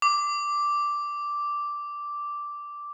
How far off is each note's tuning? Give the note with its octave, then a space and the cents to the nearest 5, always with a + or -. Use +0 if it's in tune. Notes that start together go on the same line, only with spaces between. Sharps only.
D6 -5